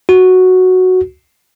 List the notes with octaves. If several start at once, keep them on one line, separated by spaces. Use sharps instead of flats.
F#4